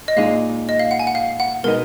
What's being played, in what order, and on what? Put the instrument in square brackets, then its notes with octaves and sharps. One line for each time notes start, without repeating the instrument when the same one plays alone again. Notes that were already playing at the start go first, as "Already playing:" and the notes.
[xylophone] D#5
[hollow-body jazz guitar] A#2 G#3 D#4 [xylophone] F5
[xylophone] D#5
F5
F#5
G#5
F#5
F5
F#5
[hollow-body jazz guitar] B2 G#3 B3 D#4 [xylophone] A#4